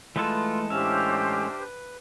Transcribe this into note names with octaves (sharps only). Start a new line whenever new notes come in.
E3 G#3 A3 F4 A4 B4
A2 C#4 D4 G4 C5 E5 F5
B4